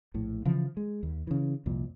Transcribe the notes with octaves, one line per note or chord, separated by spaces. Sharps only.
A#1 A2
C#3 E3 F3
G#3
D#2
C#3 E3
C2 F2 A#2